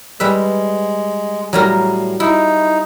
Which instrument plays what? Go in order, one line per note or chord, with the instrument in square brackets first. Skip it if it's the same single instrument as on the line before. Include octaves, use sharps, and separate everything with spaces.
[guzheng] G3 B4 E5 [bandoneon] G#3
[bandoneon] A2 [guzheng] F#3 G3 A#4
[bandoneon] D#4 [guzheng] E4